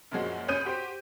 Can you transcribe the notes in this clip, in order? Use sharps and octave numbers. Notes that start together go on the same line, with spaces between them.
F#2 A#2 F3 G#3 F#4
C#2 C#4 D#6 G6 D#7
F#4 G4 C5 G5